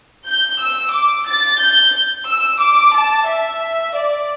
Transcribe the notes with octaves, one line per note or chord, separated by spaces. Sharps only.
G6
E6
D6
A6
G6
E6
D6
A5
E5
D5